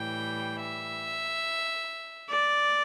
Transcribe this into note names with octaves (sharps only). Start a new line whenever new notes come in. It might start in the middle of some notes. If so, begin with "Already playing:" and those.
Already playing: A2 E3 G3 G5
E5
D5